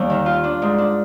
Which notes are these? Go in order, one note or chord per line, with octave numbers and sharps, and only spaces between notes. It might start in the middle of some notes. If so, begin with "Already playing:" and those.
Already playing: D#2 G3 G4
D#3
F4
D4
G#2
D4